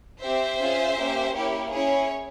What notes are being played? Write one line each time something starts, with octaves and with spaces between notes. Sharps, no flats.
C4 G4 C5 E5
C#4 F4 G#4
A#3 C#4 G4
A#3 E4 G4 C#5
C#4 E4 G#4 C#5